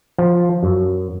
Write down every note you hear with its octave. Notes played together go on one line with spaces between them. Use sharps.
F3
F#2